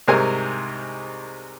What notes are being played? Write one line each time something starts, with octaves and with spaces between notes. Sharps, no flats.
C2 G#2 C3 A#4 C5 G#5